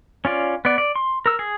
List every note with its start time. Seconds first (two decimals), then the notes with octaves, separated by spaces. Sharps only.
0.25 C#4 F4 D5
0.65 B3 D5
0.78 D5
0.96 C6
1.26 A#4 E6
1.39 G#4